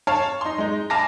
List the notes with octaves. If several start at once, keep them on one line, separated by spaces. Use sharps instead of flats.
C#5 F5 A5
D#4 C6
G#3 D#4
F5 G#5 A5 B5 D6 A#6